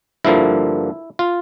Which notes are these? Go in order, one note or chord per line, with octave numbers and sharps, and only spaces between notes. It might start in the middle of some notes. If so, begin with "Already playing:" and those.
G2 D3 F3 A#3 E4
F4